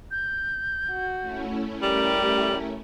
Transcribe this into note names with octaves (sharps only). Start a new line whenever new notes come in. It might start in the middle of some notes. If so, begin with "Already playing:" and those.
G6
F#4
A3 C#4 E4
G3 G4 A#4 F#7